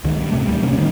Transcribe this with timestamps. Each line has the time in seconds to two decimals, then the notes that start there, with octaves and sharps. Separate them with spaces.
0.04 C#2 D#3
0.16 G2
0.32 C#2 G#2 C3 A3
0.47 D#2 G3
0.63 C3 G3 A#3 C#4
0.77 A1 D3 D#3